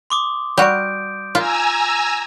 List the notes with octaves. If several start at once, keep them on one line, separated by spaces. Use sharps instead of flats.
C6 D6 D#6
G3 F#4 G6 D7
F4 G#5 A#5 E6